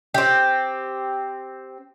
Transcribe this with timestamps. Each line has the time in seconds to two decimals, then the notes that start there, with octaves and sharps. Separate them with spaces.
0.14 C4 G4